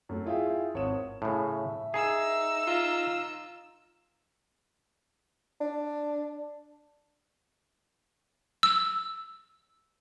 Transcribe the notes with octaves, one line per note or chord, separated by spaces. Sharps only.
F#2 A3
E4 F4 G#4 E5 G5
G#1 C#5 D#6 E7
A2 C#3 E5
D#4 G#4 E6
F4
D4
E6